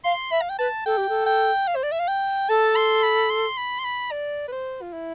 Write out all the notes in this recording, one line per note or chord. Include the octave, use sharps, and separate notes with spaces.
F5 C6
E5 B5
F5
G5
B4 A5
A4 G5
G4
A4
G5
F5
C5
D5
E5
F5
G5
A4 A5
C6
B5
C6
B5
C6
B5
D5
B4
C5
F4
E4